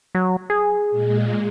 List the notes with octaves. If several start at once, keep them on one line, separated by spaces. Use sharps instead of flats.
F#3
G#4
A#2 G#3